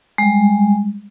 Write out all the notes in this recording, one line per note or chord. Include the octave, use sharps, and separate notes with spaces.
G3 G#3